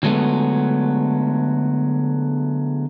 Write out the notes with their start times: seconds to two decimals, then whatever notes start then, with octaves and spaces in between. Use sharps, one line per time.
0.03 D3 F#3 G#3 A3 B3